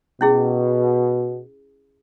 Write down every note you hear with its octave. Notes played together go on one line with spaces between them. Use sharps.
B2 C#4 E4 G#4